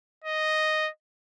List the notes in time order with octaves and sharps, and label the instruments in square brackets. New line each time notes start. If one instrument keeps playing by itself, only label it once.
[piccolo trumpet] D#5